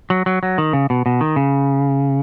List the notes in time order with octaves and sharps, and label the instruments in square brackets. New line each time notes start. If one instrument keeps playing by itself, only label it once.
[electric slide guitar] F#3
F#3
F#3
D#3
C#3
B2
B2
D#3
C#3